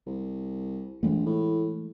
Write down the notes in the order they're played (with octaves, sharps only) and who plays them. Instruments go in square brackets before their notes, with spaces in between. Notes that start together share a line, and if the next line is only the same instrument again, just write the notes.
[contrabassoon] C2
[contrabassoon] A#1 [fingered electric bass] E3 G#3 A3
[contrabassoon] A2